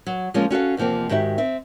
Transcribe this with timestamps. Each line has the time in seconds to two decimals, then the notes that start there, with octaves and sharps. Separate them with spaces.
0.07 F#3
0.34 F3 G#3 A#3 C#4 F4
0.50 C#4 F#4 A4 F5
0.77 E2 C3 F3 A#3 C4
1.09 G#2 D#3 F#4 G4 E5
1.38 C4 E5